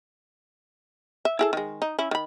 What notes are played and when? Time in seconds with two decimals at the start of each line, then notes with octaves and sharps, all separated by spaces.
1.25 E5
1.39 E4 G#4 A4
1.53 D#3 G#3
1.82 D#4
1.99 C#4 E4
2.11 D#3 B5